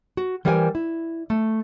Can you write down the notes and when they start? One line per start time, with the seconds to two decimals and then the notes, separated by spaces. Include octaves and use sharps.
0.17 F#4
0.45 E3 G3 A#4 C5 F#5 G#5
0.75 E4
1.30 A3